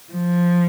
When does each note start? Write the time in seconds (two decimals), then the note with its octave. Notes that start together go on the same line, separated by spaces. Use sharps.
0.13 F3